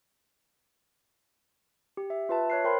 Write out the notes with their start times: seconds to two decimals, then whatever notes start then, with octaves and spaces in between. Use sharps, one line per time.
1.97 G4
2.10 E5
2.29 F4 B4 E5 A5
2.50 C#5 F#6 C7
2.64 A#4 C5 C#5 G5 B5 C6